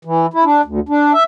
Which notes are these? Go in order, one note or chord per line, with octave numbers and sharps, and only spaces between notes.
E3
E4
D4
D2
D4
E5